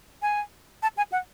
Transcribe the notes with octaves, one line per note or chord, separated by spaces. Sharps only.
G#5
A5
G#5
F#5